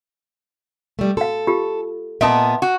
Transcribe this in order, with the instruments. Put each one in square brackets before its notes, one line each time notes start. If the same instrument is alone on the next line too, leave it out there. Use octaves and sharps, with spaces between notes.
[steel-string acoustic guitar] G3 A3
[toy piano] F#4 F5 [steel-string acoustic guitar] A4
[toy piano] F4 G4
[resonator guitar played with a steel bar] A#2 D#5 A5 [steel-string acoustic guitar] B3 E5
[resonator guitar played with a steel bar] F#4